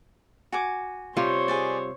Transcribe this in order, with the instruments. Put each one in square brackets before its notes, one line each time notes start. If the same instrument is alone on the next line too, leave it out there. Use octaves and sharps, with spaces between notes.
[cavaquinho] F#4 G#5 D6
[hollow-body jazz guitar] C3 G3 F4 [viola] C5 C#5
[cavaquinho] G#4 B4 D5